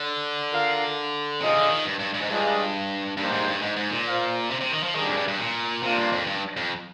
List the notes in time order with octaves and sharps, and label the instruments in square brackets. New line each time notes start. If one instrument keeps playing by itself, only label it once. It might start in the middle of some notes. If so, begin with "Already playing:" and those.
Already playing: [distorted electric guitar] D3
[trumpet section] F4 A#4 F5
[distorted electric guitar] C3 [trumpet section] F4 G#4 D#5
[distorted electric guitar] D3
D#3
G2
G2
G2
G#2
[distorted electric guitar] G2 [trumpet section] G#3 D4 F4 G#4 D#5
[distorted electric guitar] G2 [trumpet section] G3 A#3 D#4 G4 C5
[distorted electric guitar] G#2
G2
G#2
G#2
A#2
[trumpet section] F4 C5 F5
[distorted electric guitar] C3
C3
D#3
F3
[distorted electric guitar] D#3 [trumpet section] G3 D4 G#4
[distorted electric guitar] F2
G2
G2
A#2
[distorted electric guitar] C3 [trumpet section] A#3 D4 F4
[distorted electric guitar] G2
F2
G2
F2